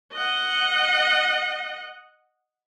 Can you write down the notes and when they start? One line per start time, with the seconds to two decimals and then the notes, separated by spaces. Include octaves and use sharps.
0.13 D#5 F#5